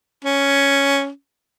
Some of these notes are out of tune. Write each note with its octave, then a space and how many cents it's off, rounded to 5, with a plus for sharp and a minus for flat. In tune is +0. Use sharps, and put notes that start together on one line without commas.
C#4 +5